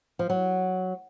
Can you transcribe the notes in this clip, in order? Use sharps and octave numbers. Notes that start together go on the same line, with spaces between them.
F3
F#3